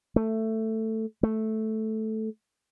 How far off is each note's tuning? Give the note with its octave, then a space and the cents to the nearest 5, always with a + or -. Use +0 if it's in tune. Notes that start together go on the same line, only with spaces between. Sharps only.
A3 +10
A3 -5